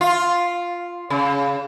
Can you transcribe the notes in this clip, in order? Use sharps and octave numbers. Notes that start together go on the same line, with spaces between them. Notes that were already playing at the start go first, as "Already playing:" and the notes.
F4
C#3